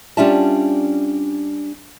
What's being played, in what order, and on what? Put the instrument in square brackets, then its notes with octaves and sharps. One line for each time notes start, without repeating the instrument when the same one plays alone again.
[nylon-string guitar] G3 C#4 D4 F4 E5 A5